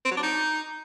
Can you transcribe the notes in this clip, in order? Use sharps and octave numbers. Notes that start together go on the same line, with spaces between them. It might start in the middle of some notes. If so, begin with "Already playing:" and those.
C4
F#3
D4
D#4